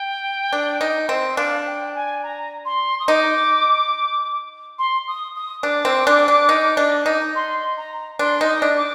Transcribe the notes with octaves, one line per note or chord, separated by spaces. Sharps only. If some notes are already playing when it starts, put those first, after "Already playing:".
Already playing: G5
D4
D#4
C4
D4 F5
G5
G#5
A#5
C6
D#6
D#4 D6
C6
D#6
D#6
D4 D6
C4
D4
D4
D#4
D4
D#4
C6
A#5
D4 C6
D#4
D#6
D4
D6